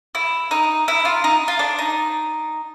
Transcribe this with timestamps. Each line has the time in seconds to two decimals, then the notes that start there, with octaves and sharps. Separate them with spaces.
0.15 E4
0.51 D#4
0.88 E4
1.05 F4
1.24 D#4
1.48 F4
1.59 D4
1.79 D#4